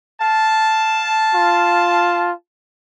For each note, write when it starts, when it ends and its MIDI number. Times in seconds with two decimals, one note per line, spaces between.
0.20 2.25 77
0.20 2.25 81
1.35 2.32 65